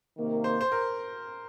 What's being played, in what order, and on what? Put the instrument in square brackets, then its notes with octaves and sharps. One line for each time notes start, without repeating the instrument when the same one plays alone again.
[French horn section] C3 D#3 A#3
[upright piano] C5
C5
A#4